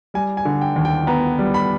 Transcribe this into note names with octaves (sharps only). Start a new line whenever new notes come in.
G3 G#5
G#5
D3
G5
D#2
G5
B3 A#5
G3
B5